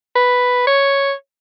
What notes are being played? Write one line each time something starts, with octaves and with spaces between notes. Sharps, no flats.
B4
C#5